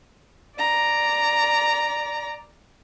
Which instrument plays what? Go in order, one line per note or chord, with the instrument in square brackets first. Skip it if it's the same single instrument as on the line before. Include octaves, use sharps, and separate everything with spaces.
[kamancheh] D5 A#5